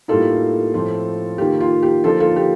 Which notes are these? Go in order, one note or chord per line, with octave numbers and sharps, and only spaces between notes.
A2 G3 A#3 D#4 F4 A4
A2 F3 C4 F4
D#3 A#3 F4 G4
F4
G4
D3 F3 A#3 D#4 F4 A4
F4 A4
G4